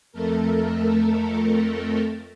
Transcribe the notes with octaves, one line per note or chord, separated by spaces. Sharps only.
F2 A3 A4 A#4